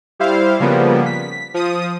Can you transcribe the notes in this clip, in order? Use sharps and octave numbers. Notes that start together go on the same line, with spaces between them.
G3 E4 C5 F5
C#3 F3 G3 A#3 B3
B6
F3 D#6